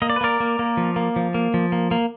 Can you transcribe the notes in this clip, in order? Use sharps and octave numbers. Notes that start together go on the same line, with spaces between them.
A#3 D#5
D5
B4
A#3 A#4 D5
A#3
A#3
F3
A#3
F3
A#3
F3
A#3
A#3